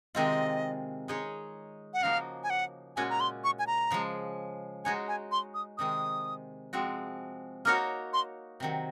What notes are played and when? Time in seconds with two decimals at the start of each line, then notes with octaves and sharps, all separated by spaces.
0.15 C3 D#3 G#3 C4 F4 D#5
1.08 G#3 D#4 G#4 C#5
1.94 F#5
2.01 C#3 F3 A#3 D#4 F#4 F5
2.43 G#5
2.50 F#5
2.96 A#2 G#3 C#4 F#4 G#5
3.10 A#5
3.20 C6
3.44 C#6
3.59 G#5
3.67 A#5
3.91 C#3 F3 G#3
4.84 G#3 D#4 F#4 C#5 G#5
5.08 G#5
5.32 C6
5.54 D#6
5.78 C3 D#3 G#3 D#6
6.73 F3 G#3 C4 F#4
7.65 A#3 D#4 F#4 A#4 C#5 F6
8.13 C6
8.60 C3 D#3 F#3